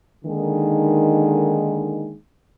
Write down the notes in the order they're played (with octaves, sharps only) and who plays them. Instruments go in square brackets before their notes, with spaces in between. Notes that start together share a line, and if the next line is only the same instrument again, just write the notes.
[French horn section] D3 D#3 G#3 A#3 D#4